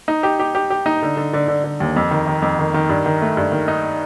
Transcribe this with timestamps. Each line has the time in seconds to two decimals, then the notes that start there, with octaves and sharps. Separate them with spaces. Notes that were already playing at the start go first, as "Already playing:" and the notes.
0.08 D#4
0.23 G4
0.39 G4
0.55 G4
0.70 G4
0.86 D#4
1.02 D3
1.17 D3
1.33 D3
1.48 D3
1.64 D3
1.80 D#2
1.96 F2
2.11 D#3
2.27 D#3
2.42 F2
2.59 D#3
2.74 D#3
2.89 G2
3.06 D#3
3.21 A3
3.37 G2
3.52 D#3
3.68 D#4